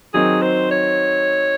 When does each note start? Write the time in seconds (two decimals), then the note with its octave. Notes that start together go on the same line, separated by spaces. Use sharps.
0.14 D#3 F#3 C4 D#4 G#4
0.42 C5
0.71 C#5